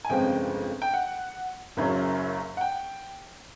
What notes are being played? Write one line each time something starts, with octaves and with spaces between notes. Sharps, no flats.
G#5
G1 F2 C#3 F3 G#3 G5
G5
F#5
F#1 F#2 C#3 F#3
F#5
G5